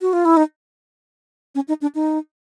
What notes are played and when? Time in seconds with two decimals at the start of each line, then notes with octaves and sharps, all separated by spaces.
0.01 F#4
0.13 F4
0.25 E4
0.37 D#4
1.55 C#4
1.68 D#4
1.82 D4
1.95 D#4